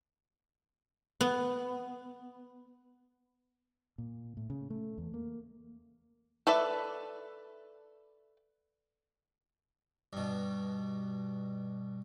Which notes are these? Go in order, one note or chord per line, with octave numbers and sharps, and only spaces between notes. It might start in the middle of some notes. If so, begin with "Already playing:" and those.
B3
A#2
A2
C#3
A3
E2
A#3
A4 B4 D5 E5
G2 B2